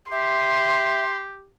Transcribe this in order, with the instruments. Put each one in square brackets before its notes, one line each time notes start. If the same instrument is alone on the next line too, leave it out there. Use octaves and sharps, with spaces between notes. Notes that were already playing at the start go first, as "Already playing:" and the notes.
[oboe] G4 [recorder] E5 [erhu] C6